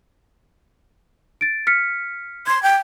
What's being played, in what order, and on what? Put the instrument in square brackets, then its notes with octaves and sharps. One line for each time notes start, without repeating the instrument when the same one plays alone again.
[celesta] A6 D7
F6 B6 C#7
[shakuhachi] C6 [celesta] G#6
[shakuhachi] G5